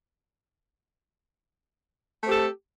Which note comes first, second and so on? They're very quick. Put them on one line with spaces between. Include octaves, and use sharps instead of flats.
A3 C4 G4 A4